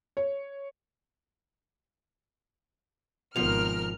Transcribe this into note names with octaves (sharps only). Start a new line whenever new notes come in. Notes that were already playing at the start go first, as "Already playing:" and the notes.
C#5
G#1 B2 F3 A#4 F6 F7